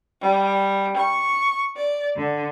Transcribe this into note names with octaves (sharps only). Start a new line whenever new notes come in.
G3
C#6
D5
D3